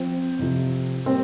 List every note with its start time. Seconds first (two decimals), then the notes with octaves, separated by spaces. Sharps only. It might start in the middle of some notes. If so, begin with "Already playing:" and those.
Already playing: F3 C4 C5
0.39 F2 C3 F3
1.06 G3 A#3 C4 C5